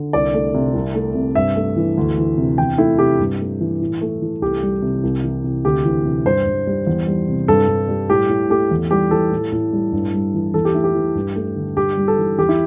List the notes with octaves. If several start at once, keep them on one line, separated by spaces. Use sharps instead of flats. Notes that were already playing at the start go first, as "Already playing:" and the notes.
Already playing: D3
C2 D5
A3
C3
C2
A3
C3
G2 E5
A3
E3
D2
E3
C3
E2 G5
A3 E4
C3 G4
G2
A3
E3
A2
A3
E3
C2 G4
G3
C3
C2
E3
C3
D2 G4
E3
C3
G2 C5
G2
G3
E2
G3
C3
G2 A4
G2
G3
A2 G4
A2
A3 G4
E2
G3 G4
E3 A4
A2
A2
G3
G2
G3
E3
E2 A4
G4
A3 E4
G4
E3
G2
A3
D3
G2 G4
G3
A4
E3
E2 G4
E4